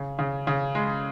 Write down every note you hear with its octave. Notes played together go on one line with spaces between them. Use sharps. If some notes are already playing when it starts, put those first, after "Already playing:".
Already playing: C#3
C#3
C#3
G#3